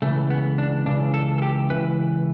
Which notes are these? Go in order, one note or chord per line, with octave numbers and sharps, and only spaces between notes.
C#2 C#3 E3 A3
B3
D4
C#2 C#3 E3 D4
A4
A4
G4
C#2 C#3 E3 B4